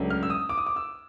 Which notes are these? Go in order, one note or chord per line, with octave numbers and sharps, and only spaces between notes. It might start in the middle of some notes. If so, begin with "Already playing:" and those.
Already playing: C#2 C#3 F#3 A3 D4
F6
E6
D#6
D6
D#6
D6
E6